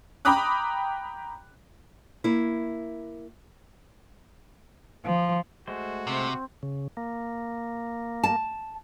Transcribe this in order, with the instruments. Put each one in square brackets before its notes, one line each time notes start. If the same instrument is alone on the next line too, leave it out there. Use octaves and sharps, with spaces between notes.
[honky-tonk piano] G5 A#5 B5 D6 D#6 F#6
[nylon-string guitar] A#3 E4
[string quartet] F3
[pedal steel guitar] G#3 A3 C5 [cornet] F#4
[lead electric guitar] C3 [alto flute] C4
[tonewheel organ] C#3
A#3
[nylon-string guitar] A5